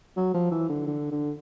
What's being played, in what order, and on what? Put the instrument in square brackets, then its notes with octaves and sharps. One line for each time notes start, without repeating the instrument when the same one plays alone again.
[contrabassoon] F#3
F3
E3
D3
D3
D3